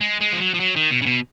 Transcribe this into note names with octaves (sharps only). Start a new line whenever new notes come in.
G#3
G#3
F3
F#3
F3
F#3
D#3
B2
C#3
B2